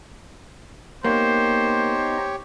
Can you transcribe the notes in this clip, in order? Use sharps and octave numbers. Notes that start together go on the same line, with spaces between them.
A#3 B3 D#4 G4 C5 C#5 D#5